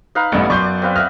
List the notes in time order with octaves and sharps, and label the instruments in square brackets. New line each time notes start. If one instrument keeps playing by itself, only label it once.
[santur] D#4 B4 F5
[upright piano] A1 G2 [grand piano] A3 [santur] B3 D5
[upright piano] F#2 G6 [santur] D5 [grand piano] C6 C#6
[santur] C4 B4 F5
[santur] D#5 E5 F#5 [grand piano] F6